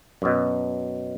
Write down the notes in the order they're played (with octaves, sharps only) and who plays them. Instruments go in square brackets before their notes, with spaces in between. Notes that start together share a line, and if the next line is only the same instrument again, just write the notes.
[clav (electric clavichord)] F#2 B2